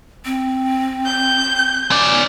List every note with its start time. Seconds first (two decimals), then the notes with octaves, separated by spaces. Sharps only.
0.25 C4
1.05 G6
1.91 C#4 D5